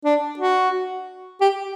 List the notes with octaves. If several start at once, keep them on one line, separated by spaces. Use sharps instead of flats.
D4
F#4
G4